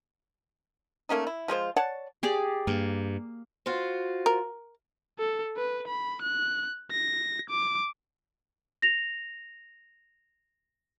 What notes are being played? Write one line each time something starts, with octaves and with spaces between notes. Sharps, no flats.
A3 A#3 C#4 D#4
E4
F3 G#3 F4 C5
C#5 D5 F#5 A5
G4 G#4 D5
G2 A#3
F4 F#4 C5
A#4
A4
B4
B5
F#6
A#6
D6
A#6 F7